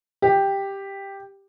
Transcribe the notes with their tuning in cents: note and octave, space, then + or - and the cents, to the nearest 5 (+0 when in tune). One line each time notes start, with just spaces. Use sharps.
G4 +5